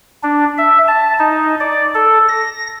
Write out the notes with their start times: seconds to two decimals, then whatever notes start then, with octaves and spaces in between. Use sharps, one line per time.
0.23 D4
0.58 E5
0.88 A5
1.19 D#4
1.60 D5
1.95 A4
2.29 A#6